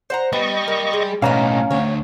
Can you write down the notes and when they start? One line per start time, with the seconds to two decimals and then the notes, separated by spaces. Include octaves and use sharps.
0.10 C5 F#5 A#5
0.33 G3 B3 D#5 C#6
0.68 A#3
0.93 G#3
1.22 B1 A2 F#3 B3 C#4 D#4 F5 A#5
1.71 D2 C#5